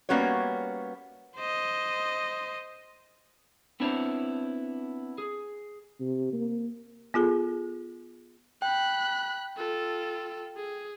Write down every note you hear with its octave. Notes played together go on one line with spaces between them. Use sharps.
G3 A#3 B3 C#4 F#4 C#5
C5 D#5
B3 C4 D4 E4 C5 C#5
G#4
C3
A#3
B3 F4 G#4 A4
G5 B5 F#6
F4 A4
G#4